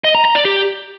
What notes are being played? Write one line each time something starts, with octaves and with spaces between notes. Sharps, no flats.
D#5
A#5
A#5
D5
G4